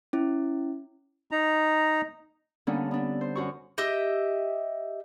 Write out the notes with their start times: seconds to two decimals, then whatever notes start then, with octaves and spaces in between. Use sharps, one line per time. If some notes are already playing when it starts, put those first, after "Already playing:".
0.13 C#4 E4
1.31 D#4 A#5
2.67 D3 G3 A#3 B3 C#4 D4
2.91 B3 D4
3.21 C5
3.35 F#2 F#4 C#6
3.78 G4 D#5 E5